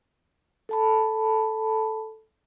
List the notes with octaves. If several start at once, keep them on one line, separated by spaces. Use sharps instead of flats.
A4 A5 B5